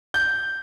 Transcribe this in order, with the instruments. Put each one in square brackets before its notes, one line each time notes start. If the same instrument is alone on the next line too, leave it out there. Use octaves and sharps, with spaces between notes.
[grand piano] G6